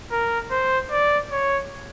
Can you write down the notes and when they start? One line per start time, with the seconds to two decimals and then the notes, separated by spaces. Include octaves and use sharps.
0.12 A#4
0.51 C5
0.91 D5
1.31 C#5